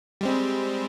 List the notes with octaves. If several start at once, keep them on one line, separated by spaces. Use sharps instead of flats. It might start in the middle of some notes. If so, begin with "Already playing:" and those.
G3 G#3 C4